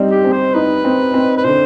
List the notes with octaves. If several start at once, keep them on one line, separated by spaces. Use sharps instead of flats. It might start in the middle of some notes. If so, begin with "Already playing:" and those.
Already playing: G3 C4 D#4
G4
C4
C5
D#4 B4
C4
C4
B4
D3 C5